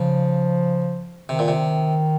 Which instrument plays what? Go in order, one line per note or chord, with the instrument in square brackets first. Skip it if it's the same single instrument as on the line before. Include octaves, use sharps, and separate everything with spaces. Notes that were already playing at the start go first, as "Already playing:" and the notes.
Already playing: [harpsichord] C#3 [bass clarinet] F3
[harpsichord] C3 [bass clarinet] D#3
[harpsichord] A#2
C3